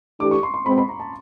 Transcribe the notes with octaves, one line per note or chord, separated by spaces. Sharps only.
E3 A3 D4 G4 D6
C#6
C6
C6
B2 G#3 C4 B5
B5
A#5
A5